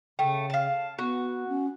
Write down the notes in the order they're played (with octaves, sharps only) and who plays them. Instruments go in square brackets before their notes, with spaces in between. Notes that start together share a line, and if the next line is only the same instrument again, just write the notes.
[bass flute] C#3 [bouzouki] A3 [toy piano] G5
[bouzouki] F5 A5
[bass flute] B3 [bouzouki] F#4
[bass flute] C#4